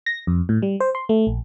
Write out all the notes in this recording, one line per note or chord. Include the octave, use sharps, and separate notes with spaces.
A#6
F2
A2
G3
C5
C6
A3
A#1